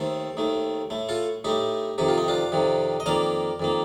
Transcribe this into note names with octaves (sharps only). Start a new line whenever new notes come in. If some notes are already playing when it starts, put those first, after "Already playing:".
Already playing: D#2 D#3 A3 A4 C5
D#2 D#3 A3
A2 A3
F4 A4
A2 A3 D#4 G4
F2 C3 D#3 G4
F4
D#4
D4 F4
F2 C3 D#3
D#5
F2 D#3 A#3 A#4 D5
F2 D#3 A#3